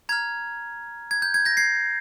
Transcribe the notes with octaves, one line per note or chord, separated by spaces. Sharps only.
A#5 F6 G#6
G#6
G6
G#6
G6 A#6
G#6 C7